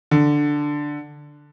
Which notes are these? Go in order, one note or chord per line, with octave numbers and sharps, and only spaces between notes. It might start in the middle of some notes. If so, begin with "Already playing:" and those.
D3